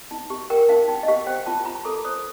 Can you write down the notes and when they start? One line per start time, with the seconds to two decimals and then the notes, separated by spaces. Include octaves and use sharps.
0.11 D#4
0.30 G4
0.50 A#4 G5
0.69 D#4 F5
0.88 D#4 G5
1.03 D#5
1.08 G4 F5
1.27 C5 G5
1.46 F4 A5
1.65 F4 A#5
1.85 A4 D6
2.05 C5 D#6